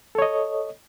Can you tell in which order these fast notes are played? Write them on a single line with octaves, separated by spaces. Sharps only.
A4 C#5 D#5